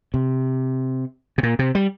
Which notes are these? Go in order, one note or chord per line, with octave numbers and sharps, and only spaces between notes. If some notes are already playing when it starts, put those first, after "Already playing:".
C3
C3
A#2
C3
G3